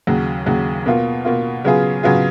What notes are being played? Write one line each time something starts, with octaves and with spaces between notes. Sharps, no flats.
D#2 C#3 F#3
D#2 C#3 F#3
B2 A#3 F4
B2 A#3 F4
C#3 F#3 B3 F4 G#4
C#3 F#3 B3 F4 G#4